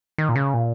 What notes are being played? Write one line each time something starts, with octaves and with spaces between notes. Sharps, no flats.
D#3
A#2
C#3
A#2